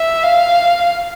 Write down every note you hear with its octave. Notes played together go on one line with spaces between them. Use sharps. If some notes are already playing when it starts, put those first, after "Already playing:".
Already playing: E5
F5